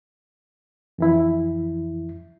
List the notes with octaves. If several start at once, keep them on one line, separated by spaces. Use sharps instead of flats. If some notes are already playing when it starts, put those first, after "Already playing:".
F2 E3 E4